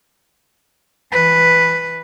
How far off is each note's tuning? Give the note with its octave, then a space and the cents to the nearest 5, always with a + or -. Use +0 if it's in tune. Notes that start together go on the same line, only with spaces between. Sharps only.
E3 +0 B4 +0